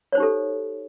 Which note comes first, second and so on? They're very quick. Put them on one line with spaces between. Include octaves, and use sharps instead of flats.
C#5 C5 D#4 G4 A4